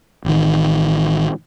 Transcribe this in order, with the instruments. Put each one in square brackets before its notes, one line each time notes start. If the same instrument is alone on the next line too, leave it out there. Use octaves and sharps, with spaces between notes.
[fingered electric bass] A1 D#3